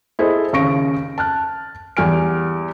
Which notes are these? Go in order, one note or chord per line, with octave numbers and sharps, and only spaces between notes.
E4 G#4 A4 C5 D#5
D#2 C#3 C#6 A#6 D7
A5 F6 F#6
E2 G3 G#5 F6 D7